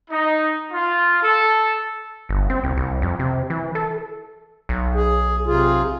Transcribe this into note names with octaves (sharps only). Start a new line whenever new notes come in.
D#4
F4
A4
G1
C4
C2
C2
F2
C3
E3
A4
B1
G#4
C3 F4 G#4